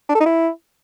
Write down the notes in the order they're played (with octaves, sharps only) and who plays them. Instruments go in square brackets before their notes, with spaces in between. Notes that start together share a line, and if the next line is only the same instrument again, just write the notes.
[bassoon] D4
A4
D#4
E4